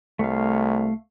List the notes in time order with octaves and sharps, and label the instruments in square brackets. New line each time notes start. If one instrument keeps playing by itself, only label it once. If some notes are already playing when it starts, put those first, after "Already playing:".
[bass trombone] C2 [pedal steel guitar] A3 F5